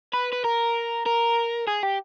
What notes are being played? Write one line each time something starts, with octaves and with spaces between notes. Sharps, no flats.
B4
B4
A#4
A#4
G#4
G4